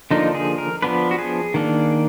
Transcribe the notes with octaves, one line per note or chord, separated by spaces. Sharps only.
D3 F3 A#3 D4 D#4
G#4
A#4
F3 B3 D4 B4
F#4
G#4
D#3 A#3 D4